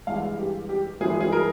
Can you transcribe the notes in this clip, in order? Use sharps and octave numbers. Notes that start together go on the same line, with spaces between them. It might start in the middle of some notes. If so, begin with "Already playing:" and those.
G2 E3 G#3 F5
G4
G4
G2 E3 G#3 G#4
G#4
A#4